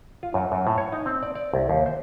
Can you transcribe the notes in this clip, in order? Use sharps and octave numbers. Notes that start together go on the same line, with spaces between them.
F4
F#2
F#2
A2
C#5
D#4
C4
D5
D5
C2
D#2
C5